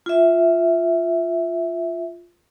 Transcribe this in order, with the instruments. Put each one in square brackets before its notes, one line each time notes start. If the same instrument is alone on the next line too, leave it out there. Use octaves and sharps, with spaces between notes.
[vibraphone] F4 E5